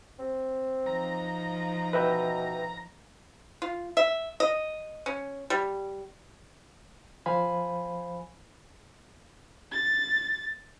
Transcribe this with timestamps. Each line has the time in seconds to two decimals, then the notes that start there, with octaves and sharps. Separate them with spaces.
0.19 C4
0.86 F3 D#4 A#5
1.93 B2 B4 E5 G5
3.62 F4
3.97 E5
4.40 D#5
5.06 C#4
5.50 G3
7.26 F3 C5 F5 G#5 B5
9.72 A6